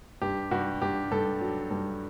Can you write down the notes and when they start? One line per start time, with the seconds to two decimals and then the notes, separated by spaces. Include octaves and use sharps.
0.22 G2 G4
0.51 G2 F#4
0.81 G2 G4
1.11 G2 A4
1.41 F#3
1.71 G2